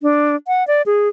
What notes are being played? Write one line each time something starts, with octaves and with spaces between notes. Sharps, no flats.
D4
F#5
D5
G#4